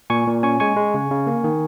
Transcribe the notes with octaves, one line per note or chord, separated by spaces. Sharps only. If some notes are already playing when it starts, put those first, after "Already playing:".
A#2 G#5 C#6
A#2
C#4 G#5 C#6
G#3 G#5 C#6
G#3
C#3
C#3
A#3
D#3